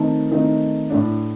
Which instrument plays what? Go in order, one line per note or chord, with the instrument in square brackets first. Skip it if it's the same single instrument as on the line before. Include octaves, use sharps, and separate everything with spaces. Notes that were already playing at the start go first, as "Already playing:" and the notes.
Already playing: [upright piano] D#3 A3 C4 D#4 A5
D#3 A3 C4 D#4
A2 A3 D4